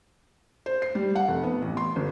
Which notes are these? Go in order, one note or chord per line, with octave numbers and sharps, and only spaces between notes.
C5
C7
G3
F#5
F1
B3
A1
C6
G1